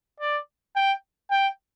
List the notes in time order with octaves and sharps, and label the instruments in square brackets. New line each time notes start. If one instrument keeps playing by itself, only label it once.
[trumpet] D5
G5
G5